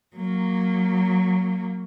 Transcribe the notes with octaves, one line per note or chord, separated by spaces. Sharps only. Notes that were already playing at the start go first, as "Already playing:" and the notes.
F#3 A#3